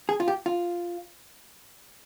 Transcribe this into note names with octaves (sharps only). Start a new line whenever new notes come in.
G#4
F4
G4
F4